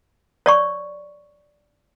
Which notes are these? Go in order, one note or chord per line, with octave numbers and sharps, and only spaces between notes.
C#5 D5 C#6